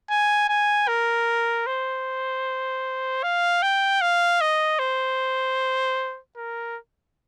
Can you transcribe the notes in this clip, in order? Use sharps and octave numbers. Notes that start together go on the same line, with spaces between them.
G#5
G#5
A#4
C5
F5
G5
F5
D#5
C5
A#4